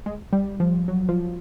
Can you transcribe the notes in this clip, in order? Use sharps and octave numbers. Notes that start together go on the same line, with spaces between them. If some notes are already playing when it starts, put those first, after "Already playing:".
G#3
G3
F3
F#3
F3